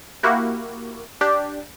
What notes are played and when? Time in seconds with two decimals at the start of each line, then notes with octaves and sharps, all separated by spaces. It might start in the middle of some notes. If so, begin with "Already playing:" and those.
0.23 A#3 E4 F#4 G4
1.21 D4 G4